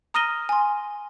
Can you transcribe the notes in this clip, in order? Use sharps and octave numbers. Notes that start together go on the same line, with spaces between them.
A#5 D#6 F6 A#6 D#7 G7
G#5 C6